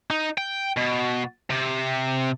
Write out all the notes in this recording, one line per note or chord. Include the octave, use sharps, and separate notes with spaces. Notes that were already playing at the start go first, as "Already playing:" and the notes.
D#4
G5
B2
C3